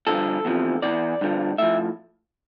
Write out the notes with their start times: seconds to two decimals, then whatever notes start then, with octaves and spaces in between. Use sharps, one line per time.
0.07 G2 D3 F3 A4
0.45 E2 C3 F3
0.82 E2 C3 E3 D5
1.21 G2 D3 F3
1.58 A2 F3 E5